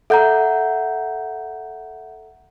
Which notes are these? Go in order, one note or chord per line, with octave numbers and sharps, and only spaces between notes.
A4 E5 F#5 A#5 G6